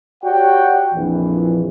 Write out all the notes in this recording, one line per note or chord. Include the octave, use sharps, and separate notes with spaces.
F#4 G4 C#5 D5 F#5 G5
A#1 F2 E3